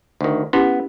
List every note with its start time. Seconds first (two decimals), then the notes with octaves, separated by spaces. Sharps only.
0.21 D2 D#3
0.53 B3 C#4 E4 G4